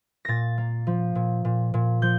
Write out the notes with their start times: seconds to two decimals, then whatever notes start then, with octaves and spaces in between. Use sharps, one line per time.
0.25 A#2 A6 A#6
0.58 A#3
0.87 F3
1.15 A#2
1.45 A#2
1.74 A#2
2.02 F3 G6